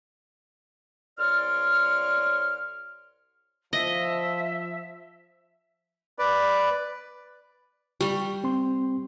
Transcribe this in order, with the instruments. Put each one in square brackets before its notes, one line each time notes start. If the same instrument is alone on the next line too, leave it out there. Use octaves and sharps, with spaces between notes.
[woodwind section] C2 C#5 D5 C6 F6
[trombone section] F3 [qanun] D#5 [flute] E5
[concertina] B4 D5
[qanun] G3 [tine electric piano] C#6
[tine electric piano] C4 C6